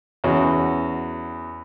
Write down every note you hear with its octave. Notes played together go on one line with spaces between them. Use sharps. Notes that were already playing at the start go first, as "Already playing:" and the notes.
E2 C#4 F#4